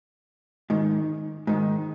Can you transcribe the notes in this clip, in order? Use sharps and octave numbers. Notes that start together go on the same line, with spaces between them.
G#2 D#3
G#2 D#3